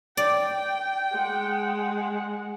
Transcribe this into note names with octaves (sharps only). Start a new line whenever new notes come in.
D5 G5
G#3 F#5